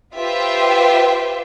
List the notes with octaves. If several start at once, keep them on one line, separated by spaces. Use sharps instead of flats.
F4 G4 B4 C5 E5 G5